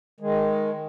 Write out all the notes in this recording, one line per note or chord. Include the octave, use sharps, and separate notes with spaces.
D#3 G#3